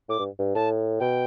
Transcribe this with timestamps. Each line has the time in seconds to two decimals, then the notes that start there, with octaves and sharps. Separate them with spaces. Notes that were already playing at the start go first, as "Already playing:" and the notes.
0.09 A2 D6
0.19 G2
0.39 G2
0.55 A2 A5
1.00 B2 G5